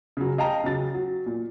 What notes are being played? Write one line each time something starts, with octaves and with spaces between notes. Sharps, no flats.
C#3 F#3
D#5 F5 G5 A5 A#5
C#3 F#3 A6
F#3
A#2